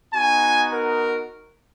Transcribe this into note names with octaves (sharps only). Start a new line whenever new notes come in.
B3 D#4 F#4 G#5
A#4